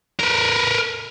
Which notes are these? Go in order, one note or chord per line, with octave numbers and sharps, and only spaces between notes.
A#4 B4